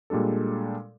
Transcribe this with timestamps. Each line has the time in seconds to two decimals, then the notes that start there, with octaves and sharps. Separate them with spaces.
0.10 A#2 G3 G#3 D4 A4